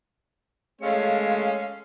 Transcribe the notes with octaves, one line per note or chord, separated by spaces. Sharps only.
G#3 A3 C#4 C#5 F5